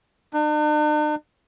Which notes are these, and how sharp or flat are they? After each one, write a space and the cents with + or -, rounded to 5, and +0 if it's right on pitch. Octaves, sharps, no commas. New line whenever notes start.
D4 +45